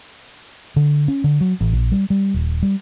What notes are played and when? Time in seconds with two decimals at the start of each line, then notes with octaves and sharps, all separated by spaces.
0.76 D3
1.08 C#4
1.24 D3
1.41 F#3
1.61 A1
1.73 A#1
1.92 G3
2.10 G3
2.34 D#1
2.62 G3